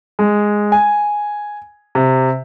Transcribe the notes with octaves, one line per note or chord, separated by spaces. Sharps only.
G#3
G#5
C3